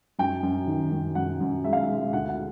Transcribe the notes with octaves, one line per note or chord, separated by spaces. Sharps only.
F#2 G5
F#2
D#3
F#2
F#2 F#5
F#2
G#3 E5
F5
E5
G#3
D2 F#5
F#5